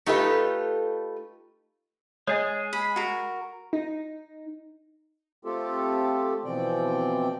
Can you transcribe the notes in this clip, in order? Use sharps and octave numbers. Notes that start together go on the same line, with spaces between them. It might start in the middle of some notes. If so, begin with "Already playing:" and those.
A3 D#4 F4 G4 A4 B4
G#3 G#4 C#5 D#5
B5
F#4 A#4
D#4
A3 C4 F4 G4 A4
B2 E3 F3 C4 D5 G5